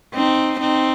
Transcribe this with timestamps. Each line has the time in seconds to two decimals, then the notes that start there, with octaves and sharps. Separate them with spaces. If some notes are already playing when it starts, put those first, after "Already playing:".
0.15 C4 D#4
0.60 C4 D#4